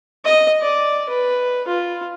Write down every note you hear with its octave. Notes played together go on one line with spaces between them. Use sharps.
D#5
D5
B4
F4